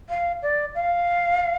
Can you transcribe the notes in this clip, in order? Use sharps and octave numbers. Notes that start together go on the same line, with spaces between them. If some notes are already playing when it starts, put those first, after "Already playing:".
F5
D5
F5